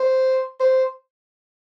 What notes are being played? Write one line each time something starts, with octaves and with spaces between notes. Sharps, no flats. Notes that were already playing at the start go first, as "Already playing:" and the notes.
Already playing: C5
C5